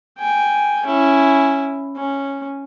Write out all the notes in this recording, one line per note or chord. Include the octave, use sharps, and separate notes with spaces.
G5 G#5
C#4 E4
C#4